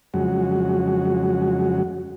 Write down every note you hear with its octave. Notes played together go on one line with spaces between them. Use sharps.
F2 C#3 F#3 G#3 F#4